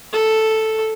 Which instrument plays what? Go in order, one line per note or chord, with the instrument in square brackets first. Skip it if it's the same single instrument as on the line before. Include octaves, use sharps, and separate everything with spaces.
[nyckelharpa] A4